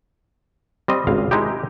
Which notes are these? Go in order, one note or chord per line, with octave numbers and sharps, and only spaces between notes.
G3 C4 D#5
G#1 C#2 F5
G#3 D#4 E4 G4